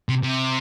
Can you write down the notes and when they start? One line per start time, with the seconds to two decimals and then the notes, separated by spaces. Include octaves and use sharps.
0.09 C3
0.23 C3